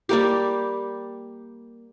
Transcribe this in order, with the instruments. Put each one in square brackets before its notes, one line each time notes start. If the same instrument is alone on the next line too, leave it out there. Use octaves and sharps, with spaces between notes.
[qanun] G3 A#3 G4